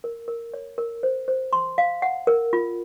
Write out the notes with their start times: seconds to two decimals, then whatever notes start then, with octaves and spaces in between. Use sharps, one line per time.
0.04 A#4
0.28 A#4
0.54 C#5
0.78 A#4
1.03 C5
1.28 C5
1.53 C6
1.78 F5
2.02 F#5
2.27 A#4
2.53 F4